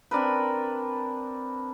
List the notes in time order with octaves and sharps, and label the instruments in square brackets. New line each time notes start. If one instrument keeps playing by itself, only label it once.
[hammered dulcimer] C4 D4 A#4 B4